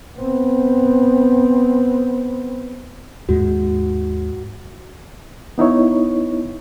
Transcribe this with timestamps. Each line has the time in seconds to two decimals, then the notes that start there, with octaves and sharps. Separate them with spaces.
0.19 B3 C4
3.29 D#2 G#2 G#3 F#4
5.58 B3 D#4 E4 C#5